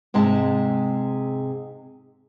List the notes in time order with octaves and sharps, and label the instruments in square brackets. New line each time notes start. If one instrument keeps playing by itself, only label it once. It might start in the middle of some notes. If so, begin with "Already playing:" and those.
[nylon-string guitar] G#2 C3 G#3 D#4 A5